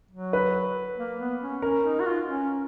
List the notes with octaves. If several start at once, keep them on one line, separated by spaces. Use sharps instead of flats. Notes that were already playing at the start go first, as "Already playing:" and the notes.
F#3
B4
A#3
B3
C#4
C#4 A#4
D#4
F#4
F4
C#4